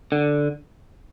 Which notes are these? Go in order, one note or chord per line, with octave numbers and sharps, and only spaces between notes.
D3